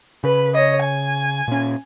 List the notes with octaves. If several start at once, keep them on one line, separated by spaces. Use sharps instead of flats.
C#3 B4
C#5 D#5
G#5
A#2 C#4